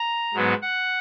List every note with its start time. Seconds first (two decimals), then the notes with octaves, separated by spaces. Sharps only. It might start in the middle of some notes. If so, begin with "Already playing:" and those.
Already playing: A#5
0.34 G#2 F#3 B3
0.62 F#5